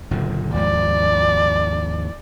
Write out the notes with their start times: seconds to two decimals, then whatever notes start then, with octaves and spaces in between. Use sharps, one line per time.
0.11 F#1 A#2 D3
0.54 D#2 G#2 F3 D5